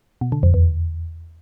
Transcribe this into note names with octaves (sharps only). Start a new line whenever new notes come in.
B2
D3
F2
E2